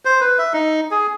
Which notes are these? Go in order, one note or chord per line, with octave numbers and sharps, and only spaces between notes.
C5
B4
E5
D#4
G#4